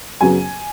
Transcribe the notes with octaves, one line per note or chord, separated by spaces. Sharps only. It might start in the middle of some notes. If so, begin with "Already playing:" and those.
F#2 C#3 F#3 B3 G#5